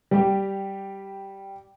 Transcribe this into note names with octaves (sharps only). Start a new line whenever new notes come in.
G3 G4